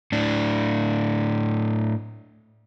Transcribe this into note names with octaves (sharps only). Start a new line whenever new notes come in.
A2 D4